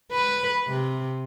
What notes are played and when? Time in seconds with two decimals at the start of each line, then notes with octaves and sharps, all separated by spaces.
0.12 B4
0.68 C3